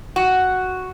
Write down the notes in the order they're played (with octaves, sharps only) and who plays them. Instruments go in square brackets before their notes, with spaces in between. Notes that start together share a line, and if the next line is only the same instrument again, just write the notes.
[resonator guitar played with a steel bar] F#4